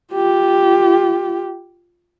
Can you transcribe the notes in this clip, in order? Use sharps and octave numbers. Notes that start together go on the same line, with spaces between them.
F4 G4